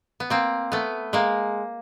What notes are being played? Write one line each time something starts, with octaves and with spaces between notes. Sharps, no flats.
B3
A#3 C4
A3 B3
G#3 A#3